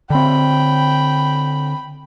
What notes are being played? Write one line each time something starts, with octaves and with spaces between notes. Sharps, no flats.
D3 C4 G5 B5